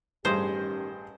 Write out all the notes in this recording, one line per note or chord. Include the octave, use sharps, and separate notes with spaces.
A1 G2 D#3 C#4 G4 G#4 C5